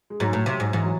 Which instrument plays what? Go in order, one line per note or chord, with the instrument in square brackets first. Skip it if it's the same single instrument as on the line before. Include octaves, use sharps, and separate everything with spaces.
[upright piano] G#3
[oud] G#2 [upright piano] F#3
[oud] A2
C3
G#2
[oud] G#2 [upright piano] E3
[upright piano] F#3